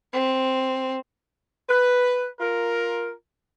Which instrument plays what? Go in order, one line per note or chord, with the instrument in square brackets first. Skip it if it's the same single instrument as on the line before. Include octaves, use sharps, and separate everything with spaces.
[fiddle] C4
[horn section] B4
F4 A#4